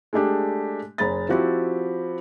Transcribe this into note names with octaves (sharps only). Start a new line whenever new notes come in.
G#3 A3 D4 G4
F#1 G#4 C5 A#5 B5 A6
F3 C4 E4 F#4 G4